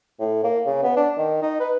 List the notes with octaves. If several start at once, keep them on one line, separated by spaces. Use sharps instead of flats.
A2
A#3
C#3
B3
D4
D#3
D#4
B4